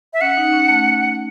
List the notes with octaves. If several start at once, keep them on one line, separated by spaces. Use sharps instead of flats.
E5
C#4 F#5
D#4
C#4
A3